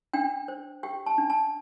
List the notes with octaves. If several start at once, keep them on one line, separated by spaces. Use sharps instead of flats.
D4 G5
C5
G4 G5
A5
D4
A5